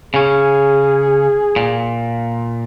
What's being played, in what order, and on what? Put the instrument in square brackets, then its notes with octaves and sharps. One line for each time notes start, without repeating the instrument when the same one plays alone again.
[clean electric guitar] C#3 C#4 [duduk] G#4
[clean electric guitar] A#2